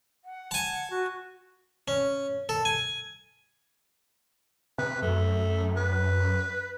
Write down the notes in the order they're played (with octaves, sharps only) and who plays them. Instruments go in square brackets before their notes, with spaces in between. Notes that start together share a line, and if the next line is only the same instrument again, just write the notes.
[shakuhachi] F#5
[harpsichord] G#5 A5
[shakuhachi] F#4
[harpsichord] C#4
A4
G#5
[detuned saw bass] C3 [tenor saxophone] B4
[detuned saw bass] F#2 [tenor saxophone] A3
[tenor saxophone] B4